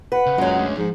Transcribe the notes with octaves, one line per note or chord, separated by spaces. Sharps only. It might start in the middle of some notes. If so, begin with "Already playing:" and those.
B4 F#5
C#3
F#2 G#3 C#4 F4 A#5
A3 D4
G#2 F3